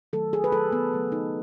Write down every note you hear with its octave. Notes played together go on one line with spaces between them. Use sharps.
D#3 F#3 A3 A4
G#4
B4
D#3 F#3 A3 A4
B3
C#3 F#3 A3
D#4